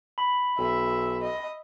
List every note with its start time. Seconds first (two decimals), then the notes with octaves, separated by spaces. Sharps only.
0.18 B5
0.58 B1 E5
1.22 D#5